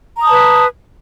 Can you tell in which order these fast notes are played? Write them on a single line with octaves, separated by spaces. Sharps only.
A#5 D#6 A5 B4